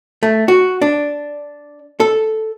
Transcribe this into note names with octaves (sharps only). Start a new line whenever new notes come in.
A3
F#4
D4
A4